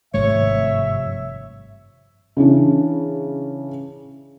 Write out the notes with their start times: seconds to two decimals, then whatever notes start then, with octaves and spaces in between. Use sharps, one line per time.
0.14 G#1 G2 C3 F3 A3 C#5 E5
2.37 C#3 E3 C#4 D4